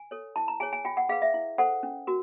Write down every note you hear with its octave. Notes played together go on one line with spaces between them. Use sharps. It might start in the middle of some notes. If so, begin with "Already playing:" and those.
Already playing: G#5
A4 C#5
E4 A5
A#5
G#4 C#5 G#5
G#5
F4 G5
F#5
G#4 B4 F5
E5
E4
A4 C5 F#5
C#4
F#4 A#4